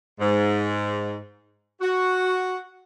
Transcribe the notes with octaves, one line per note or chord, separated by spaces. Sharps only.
G#2
F#4